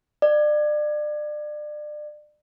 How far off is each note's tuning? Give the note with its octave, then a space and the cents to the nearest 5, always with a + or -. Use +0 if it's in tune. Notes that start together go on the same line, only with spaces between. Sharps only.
D5 +30